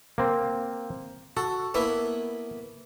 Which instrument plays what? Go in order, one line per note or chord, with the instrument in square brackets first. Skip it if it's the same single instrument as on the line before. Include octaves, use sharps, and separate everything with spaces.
[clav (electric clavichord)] A#3 C4
[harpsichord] F#4 [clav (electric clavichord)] A4
[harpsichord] A#3 B3 E4